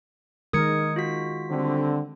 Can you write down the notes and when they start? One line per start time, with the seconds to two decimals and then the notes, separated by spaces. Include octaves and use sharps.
0.53 D#3 G#3 A#4 D#6 G#6 C#7
0.96 F4 F#4 B6
1.51 D3 G3 C4